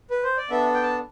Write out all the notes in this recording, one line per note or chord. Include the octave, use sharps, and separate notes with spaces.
B4
C5
D5
B3 D4 A4 E5
G5
A5